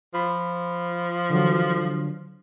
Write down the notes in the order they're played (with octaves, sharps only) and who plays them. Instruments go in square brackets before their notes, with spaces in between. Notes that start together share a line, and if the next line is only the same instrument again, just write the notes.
[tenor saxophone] F3 [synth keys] B5
[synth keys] D3 E3 F#3